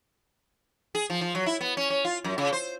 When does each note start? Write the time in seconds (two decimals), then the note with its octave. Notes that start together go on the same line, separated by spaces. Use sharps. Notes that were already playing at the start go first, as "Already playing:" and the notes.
0.95 G#4
1.10 F3
1.21 F3
1.35 F#3
1.46 E4
1.61 B3
1.77 C#4
1.90 C#4
2.05 F4
2.24 F#2
2.38 C#3
2.53 C5